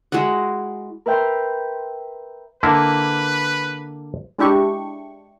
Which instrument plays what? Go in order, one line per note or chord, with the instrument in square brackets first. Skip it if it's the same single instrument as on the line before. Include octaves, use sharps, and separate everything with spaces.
[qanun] G#3 E4 F#4 F#5
[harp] A#4 B4 E5 G5 A#5 C6
[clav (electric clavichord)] D3 A#3 E4 [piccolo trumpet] B4
[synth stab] G#3 D4 E4 G4 C#6